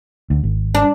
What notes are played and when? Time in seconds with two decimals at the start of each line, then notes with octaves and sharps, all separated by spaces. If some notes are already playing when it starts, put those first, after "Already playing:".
0.30 D2
0.43 G#1
0.75 D4